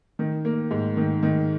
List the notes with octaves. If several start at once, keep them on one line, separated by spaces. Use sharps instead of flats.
D#3
A#3
G#2
D#3
D#3